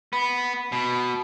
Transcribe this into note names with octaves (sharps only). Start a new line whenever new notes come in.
B3
B2